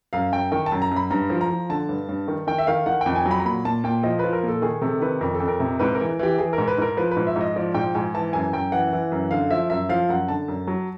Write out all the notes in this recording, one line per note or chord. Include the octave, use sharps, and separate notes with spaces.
F#2 F5
F#2 G5
D#3 G5
A5
F#2
A#5
F#2
B5
G2 A#5
F3
A#5
F3
D3 A5
G2
G2
D#3
D#3 G5
E5
D#3 F5
D#3 F#5
F2 G5
G#5
F#3
B5
A#5
A#2 B5
A#2 A5
A#2 G5
F3 D#5
F3 B4
A#4
A#2 A4
D#3 G#4
C3 A4
D#3 B4
F2 A#4
A4
F2
A#4
C3
G#2 B4
A#4
E3
E3 G4
E3 G#4
A#4
G#2
B4
G#2 A#4
F3 B4
B4
G#2
E5
G#2
D#5
F3 D5
G#2 G5
G#2 G#5
E3 A5
F#2 G#5
F#2 G5
E3 F#5
E3
F#2
D3 F5
F3 E5
F#2 E5
F3 F5
F#2 F#5
D3 A5
F#2
F#3